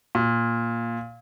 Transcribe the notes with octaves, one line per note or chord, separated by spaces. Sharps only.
A#2